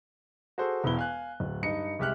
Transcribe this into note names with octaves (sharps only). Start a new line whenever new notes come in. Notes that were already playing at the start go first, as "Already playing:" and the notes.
F#4 G#4 A4 C5
E1 B3 E4 G7
F5 G#5 F#6
D1
G2 D#4 C#7
C2 G#3 G4 E5 F6 F#6